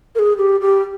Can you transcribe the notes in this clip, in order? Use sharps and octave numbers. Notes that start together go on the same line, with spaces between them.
A#4
G#4
G4
G4